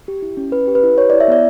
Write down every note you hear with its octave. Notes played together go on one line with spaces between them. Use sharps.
G4
E4
C#4
C#4 B4
G4
B4
E4
G4 C#5
E4 D5
E5
B3 D5